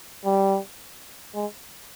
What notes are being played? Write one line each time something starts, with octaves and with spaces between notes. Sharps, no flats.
G3
G#3